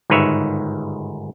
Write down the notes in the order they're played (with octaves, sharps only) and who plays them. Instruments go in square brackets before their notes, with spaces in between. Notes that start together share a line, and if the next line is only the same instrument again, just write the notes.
[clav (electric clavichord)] G1 G#2 D#3 B4 C#5 E5